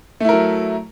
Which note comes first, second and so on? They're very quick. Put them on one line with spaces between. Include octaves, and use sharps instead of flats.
A3 E4 A#4 F#3